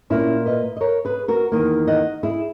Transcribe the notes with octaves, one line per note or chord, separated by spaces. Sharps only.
A#2 A#3 C#4 E4
B4 D#5
D#5
A#4 C#5
G#4 B4
F#4 A#4
E2 D#3 A#3
D#5 F#5
E4 G#4